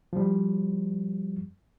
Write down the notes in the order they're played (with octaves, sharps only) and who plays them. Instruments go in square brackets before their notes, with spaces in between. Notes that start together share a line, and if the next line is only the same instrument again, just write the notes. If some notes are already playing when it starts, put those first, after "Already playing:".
[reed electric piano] F3 G3